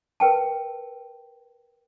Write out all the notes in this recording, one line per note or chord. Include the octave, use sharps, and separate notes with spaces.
A#4 B4 G5 A5